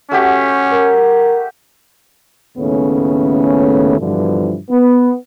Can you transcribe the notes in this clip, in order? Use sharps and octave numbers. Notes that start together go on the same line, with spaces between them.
A3 C#4 F#4 G4
A#4
D#2 A2 C#3 A3 B3 C#4
G2 B2 D3 E3 F3
B3